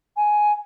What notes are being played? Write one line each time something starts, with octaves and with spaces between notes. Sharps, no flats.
G#5